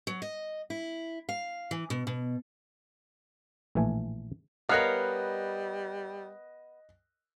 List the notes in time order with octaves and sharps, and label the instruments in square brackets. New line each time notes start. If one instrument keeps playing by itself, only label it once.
[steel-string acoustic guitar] F#3
D#5
E4
F5
E3
B2
B2
[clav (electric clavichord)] A#1 A2 E3 A3 G#5
[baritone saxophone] G3 [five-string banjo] B3 [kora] A#4 C#5 F5 [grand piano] D#5 F#6